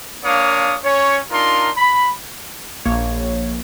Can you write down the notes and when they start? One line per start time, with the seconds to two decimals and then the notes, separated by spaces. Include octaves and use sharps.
0.24 A#3 D4 C#5 F5 D#6
0.84 C#4 C#5
1.31 D4 D#4 F4 A#4 C6
1.77 B5
2.85 A#1 A#3 C#5